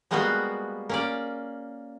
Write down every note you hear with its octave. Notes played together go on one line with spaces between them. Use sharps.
G3 G#3 A#3 B3 F4 F#4
A#3 C#4 D5